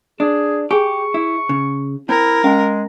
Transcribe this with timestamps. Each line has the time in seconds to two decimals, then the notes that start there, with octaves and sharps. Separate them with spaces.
0.20 D4 G#4
0.71 G4 G#4 G#5 C#6
1.14 E4
1.49 C#3
2.09 C4 E4 A#4
2.44 G#3 C#4 F5 G#5